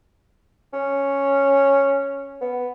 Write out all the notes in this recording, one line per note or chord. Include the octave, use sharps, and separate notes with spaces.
C#4
B3